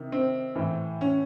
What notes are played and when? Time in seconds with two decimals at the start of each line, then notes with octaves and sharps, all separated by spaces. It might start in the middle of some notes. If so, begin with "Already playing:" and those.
Already playing: C3 D#3
0.12 C4
0.56 A2 E3
1.01 C#4